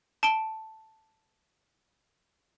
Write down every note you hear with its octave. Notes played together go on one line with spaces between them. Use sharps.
A5 D7 G7